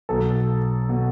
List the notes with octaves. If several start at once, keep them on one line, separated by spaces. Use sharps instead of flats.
B1 B2 A4
B2